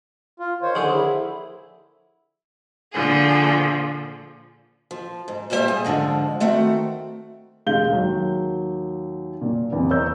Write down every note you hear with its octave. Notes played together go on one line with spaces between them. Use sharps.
F4
D#3 C5 C#5
A#1 D3 G#4
E4
A#2 D3 F3 F4 G#4
F3
G#2
F2 A#2 G3 C#4 C5 E5
G#4
G#2 D3 F3 G#3
D#3 A3 C4 F#4 F#5
E1 G#3 F5 G6 G7
D#2 F#3
A#2
E2 C3
A#4 C#5 E6 G6